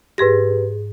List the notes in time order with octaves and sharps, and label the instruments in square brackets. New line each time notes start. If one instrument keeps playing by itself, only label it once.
[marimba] G#2 G#4 A#6 [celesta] G4 B4